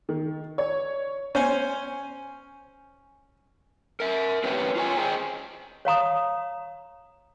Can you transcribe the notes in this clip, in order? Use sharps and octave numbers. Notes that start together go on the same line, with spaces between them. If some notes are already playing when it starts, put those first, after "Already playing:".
D#3
C#5
C#4 C5 G#5
A#4 E5
C4 C#4 G4 B4
F4 C#5 G#5
G#4 C5 D#5 G5
C#5 F5 A#5 D#6